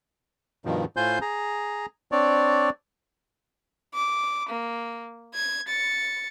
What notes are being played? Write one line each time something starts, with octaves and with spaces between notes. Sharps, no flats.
G2 B2 D#3 F3
A2 F4 C5 G#5 C6 G6
G#4 A#5
C4 D4 C#5 D5
D6
A#3
G#6
A6 C#7